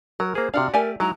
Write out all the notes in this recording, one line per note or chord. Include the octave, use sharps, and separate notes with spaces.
F#3 A#4
A#3 G#4 C5
C3 D4 F#4 F5 F6
A3 G4 A#4 D5 G#5
F#3 G#3 D#4 E4 A#5